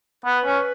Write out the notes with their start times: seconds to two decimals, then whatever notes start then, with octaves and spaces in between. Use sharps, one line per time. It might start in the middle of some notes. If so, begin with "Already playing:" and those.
0.25 B3 B4
0.45 C#4